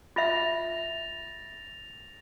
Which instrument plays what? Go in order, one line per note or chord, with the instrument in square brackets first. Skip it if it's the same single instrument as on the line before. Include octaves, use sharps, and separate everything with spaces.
[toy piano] F4 E5 [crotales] A6 A#6 F7